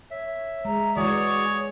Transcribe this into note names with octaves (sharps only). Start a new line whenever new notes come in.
C#5 E5
G#3 A#5
E3 G#3 F#4 G#4 C#5 D5 D#6